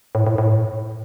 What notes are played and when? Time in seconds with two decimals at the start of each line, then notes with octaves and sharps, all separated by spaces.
0.15 A2
0.27 A2
0.38 A2